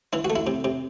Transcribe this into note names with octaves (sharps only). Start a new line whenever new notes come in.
E3 E4
F#4
A3
E4
C3
C3